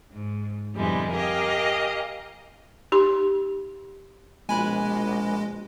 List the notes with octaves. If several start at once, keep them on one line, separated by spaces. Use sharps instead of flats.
G#2
F2 B2 D3 G3 G#3 E4
G4 G#4 A#4 D#5 F5
D#4 G4 C6
A#1 B2 F3 G#3 G#5 B5 F#6